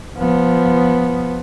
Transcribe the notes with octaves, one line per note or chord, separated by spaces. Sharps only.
F3 B3